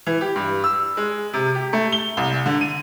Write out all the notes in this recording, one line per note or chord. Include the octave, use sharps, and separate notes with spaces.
E3
G4
G2
E6
G#3
C3
G4
A3
G7
C2
D3
D#7